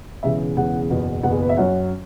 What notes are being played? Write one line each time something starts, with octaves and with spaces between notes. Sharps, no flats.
E1 E2 C#3 E3 E5
E1 E2 C#3 E3 F#5
F#1 E2 B2 B3
F#1 E2 B2 B3 F#5
G#4
B4
E5
F#2 F#3 C#4 F#5